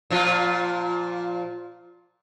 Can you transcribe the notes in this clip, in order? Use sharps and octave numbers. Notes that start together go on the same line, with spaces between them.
A#2 F3 F4